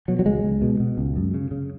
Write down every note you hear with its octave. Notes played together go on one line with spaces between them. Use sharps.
B2 F#3
F#3
C#2 G#3
C#2
B2
B2
C#2
F#2
C#3
C#3